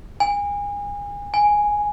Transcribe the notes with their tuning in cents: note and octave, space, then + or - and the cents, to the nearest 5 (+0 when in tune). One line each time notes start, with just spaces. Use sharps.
G#5 -30
G#5 +0